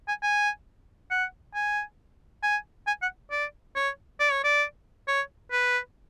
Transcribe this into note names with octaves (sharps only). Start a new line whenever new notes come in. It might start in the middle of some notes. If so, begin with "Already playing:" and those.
G#5
G#5
F#5
G#5
G#5
G#5
F#5
D5
C#5
D5
C#5
D5
C#5
B4